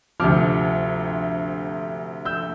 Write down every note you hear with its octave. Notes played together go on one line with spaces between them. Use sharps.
D2 C3 F3 D6 F6
E6 G6